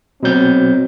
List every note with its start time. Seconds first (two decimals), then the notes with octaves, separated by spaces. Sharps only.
0.23 B2 F#3 C4 G6